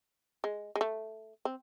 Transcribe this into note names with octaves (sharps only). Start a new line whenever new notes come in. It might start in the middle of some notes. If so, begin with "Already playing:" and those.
G#3
G#3
A3
C4